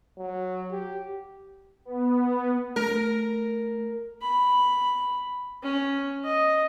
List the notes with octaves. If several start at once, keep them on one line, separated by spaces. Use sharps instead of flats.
F#3
G4
B3
A3 A#4
B5
C#4
D#5